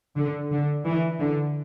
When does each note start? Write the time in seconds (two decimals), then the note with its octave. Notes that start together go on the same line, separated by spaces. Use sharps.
0.17 D3
0.51 D3
0.86 E3
1.20 D3